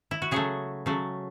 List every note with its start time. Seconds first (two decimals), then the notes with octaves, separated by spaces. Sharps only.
0.11 E4
0.22 F#4
0.31 C#3 F#3 A3 G#4
0.86 C#3 F#3 A3